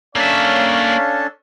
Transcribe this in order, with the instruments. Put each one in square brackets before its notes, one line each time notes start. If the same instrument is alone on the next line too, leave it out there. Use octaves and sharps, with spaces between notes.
[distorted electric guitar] A#3 E5 [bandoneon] C#4 D4 A4 [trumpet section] C#5 F5